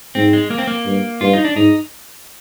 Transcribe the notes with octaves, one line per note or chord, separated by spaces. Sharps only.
G#2 C4
G#3
A#3
C4
A#3
G2
G2 F4
D#4
D4
G#2 D#4